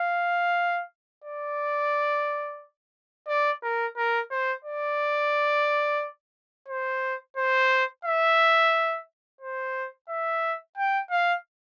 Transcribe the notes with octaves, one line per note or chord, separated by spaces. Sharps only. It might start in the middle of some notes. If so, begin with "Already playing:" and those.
Already playing: F5
D5
D5
A#4
A#4
C5
D5
C5
C5
E5
C5
E5
G5
F5